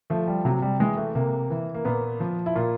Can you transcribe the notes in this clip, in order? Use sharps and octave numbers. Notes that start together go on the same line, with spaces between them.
F3 A3
G3
C3 F#3
G3
E3 G#3
A3
C3 A#3
E3
A#3
A#2 B3
F3
E4
A#2 F4